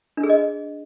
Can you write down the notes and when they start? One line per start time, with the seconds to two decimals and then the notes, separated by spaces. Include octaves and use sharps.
0.17 D4
0.23 G#4
0.30 D#5